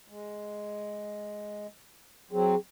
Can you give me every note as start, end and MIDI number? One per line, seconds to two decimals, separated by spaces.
0.08 1.67 56
2.32 2.55 54
2.32 2.55 60
2.32 2.57 68